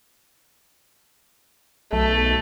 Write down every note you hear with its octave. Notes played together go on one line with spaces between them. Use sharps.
B1 A3